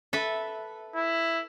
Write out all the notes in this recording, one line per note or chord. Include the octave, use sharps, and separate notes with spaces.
A4 B4 E5
E4